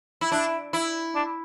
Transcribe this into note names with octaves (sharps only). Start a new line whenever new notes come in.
E4
D4 E4
E4
D4